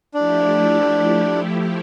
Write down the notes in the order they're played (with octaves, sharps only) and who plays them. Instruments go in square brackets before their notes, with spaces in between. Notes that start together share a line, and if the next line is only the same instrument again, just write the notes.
[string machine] F3 A3 E4 G4 [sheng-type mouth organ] D4